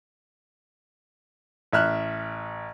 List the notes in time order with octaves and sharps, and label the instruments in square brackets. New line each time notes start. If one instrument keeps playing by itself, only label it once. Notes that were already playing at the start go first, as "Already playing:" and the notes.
[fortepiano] A1 E5 F6 F#6